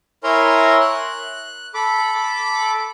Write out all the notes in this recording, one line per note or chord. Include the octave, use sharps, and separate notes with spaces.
E4 A#4 C#5 G#5 A#5 C6
F#6
A4 B5 D6